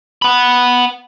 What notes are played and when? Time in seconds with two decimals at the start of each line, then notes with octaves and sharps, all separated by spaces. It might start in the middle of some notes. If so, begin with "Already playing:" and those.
0.22 F#5 B5